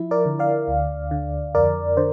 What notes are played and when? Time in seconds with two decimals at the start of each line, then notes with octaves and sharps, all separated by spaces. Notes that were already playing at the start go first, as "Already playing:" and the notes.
Already playing: F3 E4
0.11 A#4 D5
0.26 D3
0.39 D5 F5
0.68 D2
1.11 D3
1.55 F2 A#4 D5
1.97 D3 C5